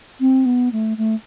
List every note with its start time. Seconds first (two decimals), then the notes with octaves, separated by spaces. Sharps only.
0.20 C4
0.45 B3
0.72 A3
0.98 A3